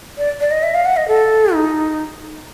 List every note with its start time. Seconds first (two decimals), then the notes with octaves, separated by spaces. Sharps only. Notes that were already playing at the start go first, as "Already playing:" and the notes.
0.18 D5
0.40 D5
0.51 D#5
0.63 E5
0.74 F5
0.85 F#5
0.97 D#5
1.08 A4
1.54 D#4